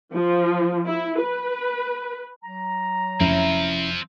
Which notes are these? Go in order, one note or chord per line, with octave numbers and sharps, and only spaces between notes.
F3
E4
B4
F#3 A#5
F1 F2 F3 C4 C#4 E4